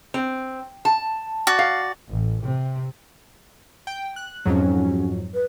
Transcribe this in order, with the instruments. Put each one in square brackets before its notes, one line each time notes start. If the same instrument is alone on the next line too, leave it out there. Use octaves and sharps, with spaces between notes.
[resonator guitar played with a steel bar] C4
A5
[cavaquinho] F#4 D5
[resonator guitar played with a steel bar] F5
[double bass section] A1
C3
[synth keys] G5
F#6
[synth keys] F2 G#2 F#3 [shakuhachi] C#4
[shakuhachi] B4